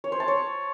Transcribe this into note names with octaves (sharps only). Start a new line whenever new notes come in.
C#5
C5
A5
C#5